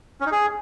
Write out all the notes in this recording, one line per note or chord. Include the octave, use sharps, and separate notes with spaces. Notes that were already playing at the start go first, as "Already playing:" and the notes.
C#4
D#4
G#4